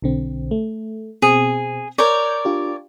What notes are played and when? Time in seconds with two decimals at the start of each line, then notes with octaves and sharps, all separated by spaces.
0.02 B1 D3 C4
0.51 A3
1.22 B2 C4 G#4
1.98 A#4 C#5 D5 C#6 G6 G#6
2.45 D4 F4 G4